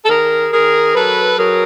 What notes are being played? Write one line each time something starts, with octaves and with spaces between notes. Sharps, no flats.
A4
D#3 G#4 A#4
D#3 G#4 A#4
F#3 A4 B4
F#3 G#4 A#4